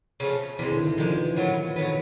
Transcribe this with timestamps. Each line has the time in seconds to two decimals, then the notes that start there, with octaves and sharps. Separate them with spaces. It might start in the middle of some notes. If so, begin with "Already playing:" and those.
0.20 C#3 F3 A3
0.59 C3 D#3 E3 G#3
0.71 D3
0.79 D#3
0.98 C3 D#3 F3 G#3
1.18 E3
1.37 A2 F#3 B3
1.76 A2 D#3 F#3 B3